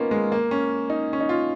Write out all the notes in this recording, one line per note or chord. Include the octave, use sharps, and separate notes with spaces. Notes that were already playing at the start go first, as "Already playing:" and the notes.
Already playing: A#3 B3 C#4 D#4 F4
G#3
A#3
C#4
D#4
C#4
D#4
F4